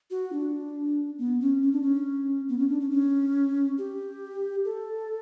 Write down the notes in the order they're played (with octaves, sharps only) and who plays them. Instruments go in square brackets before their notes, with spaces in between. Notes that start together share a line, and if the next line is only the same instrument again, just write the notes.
[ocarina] F#4
D4
B3
C#4
C#4
D4
C#4
B3
C#4
D4
C#4
C#4
G4
A4